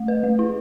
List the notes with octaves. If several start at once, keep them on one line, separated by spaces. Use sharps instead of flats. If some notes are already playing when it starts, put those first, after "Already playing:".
Already playing: A3
B4
A3
E4